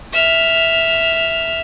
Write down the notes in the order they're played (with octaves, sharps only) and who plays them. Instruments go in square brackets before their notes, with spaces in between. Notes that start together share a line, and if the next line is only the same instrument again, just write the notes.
[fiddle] E5 F6